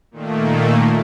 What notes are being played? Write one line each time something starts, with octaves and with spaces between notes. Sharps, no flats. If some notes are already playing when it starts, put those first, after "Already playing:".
A#2 D#3 A3 A#3